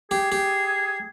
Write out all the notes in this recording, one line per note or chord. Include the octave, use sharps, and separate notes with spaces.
G4 G#4
G4